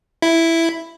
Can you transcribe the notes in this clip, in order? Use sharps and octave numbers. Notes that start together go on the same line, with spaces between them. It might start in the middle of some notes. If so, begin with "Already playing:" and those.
E4